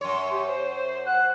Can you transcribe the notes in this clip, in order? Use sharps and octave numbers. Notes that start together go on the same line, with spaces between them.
F#2 C#5 C6
G4
C5
F#5 F#6